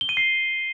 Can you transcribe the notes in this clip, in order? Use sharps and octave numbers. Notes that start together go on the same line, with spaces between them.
G7
D#7
C7